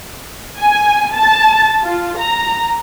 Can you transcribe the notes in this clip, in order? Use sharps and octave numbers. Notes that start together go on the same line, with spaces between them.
G#5
A5
F4
A#5